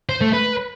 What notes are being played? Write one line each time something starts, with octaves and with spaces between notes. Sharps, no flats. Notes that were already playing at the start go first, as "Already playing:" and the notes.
C5
A3
B4